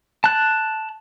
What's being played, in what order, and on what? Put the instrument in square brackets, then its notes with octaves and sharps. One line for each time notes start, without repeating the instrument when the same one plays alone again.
[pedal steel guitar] A5 F#6